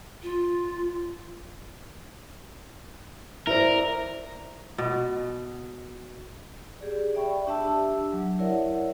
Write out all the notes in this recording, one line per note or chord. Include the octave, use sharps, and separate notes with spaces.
F4
E4 A#4 C5 D5
B2
G4 G#4 D5
D5 E5 G5 B5 C#6
D4 G4 E5 A5 E6
F#3
E4 A#4 C#5 D5 E5 F#5